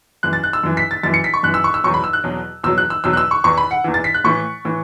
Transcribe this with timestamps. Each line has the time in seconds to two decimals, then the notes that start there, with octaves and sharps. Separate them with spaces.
0.23 F#2 E3 F#6
0.33 A6
0.44 F#6
0.53 E6
0.63 F#2 E3
0.77 B6
0.91 A6
1.03 F#2 E3 A6
1.14 C#7
1.24 B6
1.34 C#6
1.43 F#2 E3 F#6
1.54 E6
1.64 C#6
1.74 E6
1.84 E2 B2 F#3 C#6
1.94 B5
2.04 E6
2.13 F#6
2.24 E2 B2 F#3
2.64 E2 B2 F#3 E6
2.78 F#6
2.90 E6
3.04 E2 B2 F#3 E6
3.13 F#6
3.17 E6
3.31 C#6
3.44 E2 E3 C#6
3.58 B5
3.71 F#5
3.84 E2 E3
3.94 A6
4.04 B6
4.14 F#6
4.24 A2 E3 C#6
4.65 A2 E3